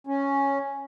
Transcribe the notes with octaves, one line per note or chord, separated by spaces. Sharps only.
C#4